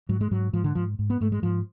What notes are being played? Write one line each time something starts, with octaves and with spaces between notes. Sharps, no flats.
G#2 F#3
G#3
G#2 F#3
G#2 F3
D3
G#2 F3
G#2
B3
G#2 A3
G#3
G#2 F3